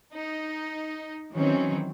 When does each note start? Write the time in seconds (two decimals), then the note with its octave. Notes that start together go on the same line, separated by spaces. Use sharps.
0.15 D#4
1.34 D#3 E3 F#3 C4 C#4